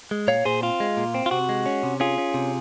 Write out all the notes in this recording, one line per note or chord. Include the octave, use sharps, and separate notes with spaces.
G#3
A#2 C#5 F5
A#2 G#4 C5
C4 F4
G#3
A#2
C4
F4
C3 F#4
G#3
C#4
C3
C#4 F4 G#4
C#4
C3